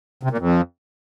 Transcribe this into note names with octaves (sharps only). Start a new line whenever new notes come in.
C3
A#2
F2